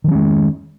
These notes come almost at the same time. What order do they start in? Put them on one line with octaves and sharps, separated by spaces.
D#3 F#3 C#4 G#3